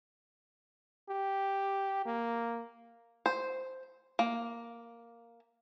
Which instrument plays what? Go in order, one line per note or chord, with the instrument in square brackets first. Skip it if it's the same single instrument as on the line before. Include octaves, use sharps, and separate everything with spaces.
[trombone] G4
A#3
[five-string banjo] C5
A#3